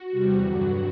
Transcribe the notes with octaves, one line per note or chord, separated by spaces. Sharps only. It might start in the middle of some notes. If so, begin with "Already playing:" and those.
Already playing: F#4
E2 C3 G3
G2 D3 F#3 F#4